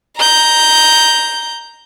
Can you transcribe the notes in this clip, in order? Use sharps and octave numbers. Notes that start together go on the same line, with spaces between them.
A#5 G6